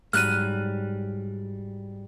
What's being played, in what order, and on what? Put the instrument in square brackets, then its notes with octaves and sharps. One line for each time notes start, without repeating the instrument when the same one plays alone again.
[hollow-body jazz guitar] G#2 F#3 G3 [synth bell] F6 F#6 D#7